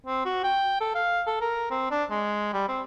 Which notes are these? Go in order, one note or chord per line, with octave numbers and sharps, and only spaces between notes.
C4
F#4
G5
A4
F5
A4
A#4
C4
D4
G#3
G3
C4